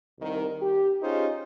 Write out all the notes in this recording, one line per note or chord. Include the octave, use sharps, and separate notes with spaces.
C2 D#3
G4
C#4 D#4 F4 G4 G#4 C5